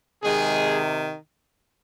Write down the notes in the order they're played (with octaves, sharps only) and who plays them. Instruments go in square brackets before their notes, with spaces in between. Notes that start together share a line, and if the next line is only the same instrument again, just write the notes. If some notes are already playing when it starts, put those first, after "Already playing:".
[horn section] C3 D#3 G#3 G#4